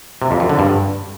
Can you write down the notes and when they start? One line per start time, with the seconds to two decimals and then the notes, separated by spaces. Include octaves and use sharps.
0.22 C3
0.31 F2
0.40 F#2
0.49 D3
0.59 G2